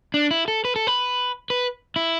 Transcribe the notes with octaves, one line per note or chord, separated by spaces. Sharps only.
D4
E4
A4
B4
A4
B4
B4
E4